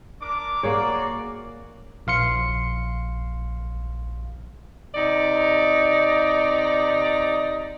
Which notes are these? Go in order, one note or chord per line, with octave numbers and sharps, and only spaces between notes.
D4 A#4 D6
A#3 F#4 G#4 C#5 D5
A#1 F5 C6 C#7
C3 D#4 D5